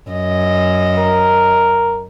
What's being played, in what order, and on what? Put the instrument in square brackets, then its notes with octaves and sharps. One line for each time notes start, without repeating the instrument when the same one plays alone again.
[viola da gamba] F#2 D#5
[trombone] A#4